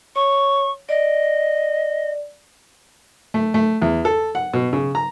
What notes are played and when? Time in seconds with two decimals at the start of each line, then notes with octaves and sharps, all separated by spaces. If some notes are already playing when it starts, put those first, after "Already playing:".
0.16 C#5 C#6
0.89 D5 D#5
3.34 A3
3.54 A3
3.82 E2
4.05 A4
4.35 F#5
4.54 B2
4.73 C#3
4.95 A#5